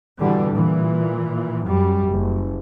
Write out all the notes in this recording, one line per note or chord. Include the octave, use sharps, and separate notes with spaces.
B2 D3 E3 G3
A#2 E3
F#2 G3
F#1